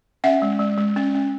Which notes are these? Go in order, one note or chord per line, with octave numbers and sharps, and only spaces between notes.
C#4 E5 F#5
G#3
G#3
G#3
C#4
C#4